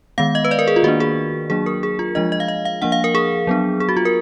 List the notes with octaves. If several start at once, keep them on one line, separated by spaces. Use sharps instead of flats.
D#3 G#3 B3 F5
D#5
B4
D5
A#4
G#4
F4
D#3 A#3 D4 F#4
G#4
F#3 A#3 D4 G#4
A#4
G#4
F4
F3 G#3 D4 D#5
D#5
F5
D#5
F5
F3 A#3 D4 F#5
F5
A#4
G#4
F#3 B3 D4
G#4
F#4
F4
A#4